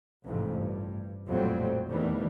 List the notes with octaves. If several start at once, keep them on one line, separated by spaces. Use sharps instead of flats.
A1 F2 G#2 C3
G2
A#1 F2 A2 F#3 G3 C4
E2 D#3 E3 G3 A3